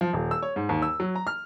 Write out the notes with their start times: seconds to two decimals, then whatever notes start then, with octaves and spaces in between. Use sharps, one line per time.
0.01 F3
0.13 D#1
0.31 E6
0.43 C#5
0.56 G#2
0.69 D#2
0.82 E6
1.00 F#3
1.15 A#5
1.27 F6